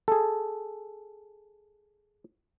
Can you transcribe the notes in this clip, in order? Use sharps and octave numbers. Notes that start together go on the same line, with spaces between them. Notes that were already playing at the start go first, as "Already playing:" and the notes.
G#4 A4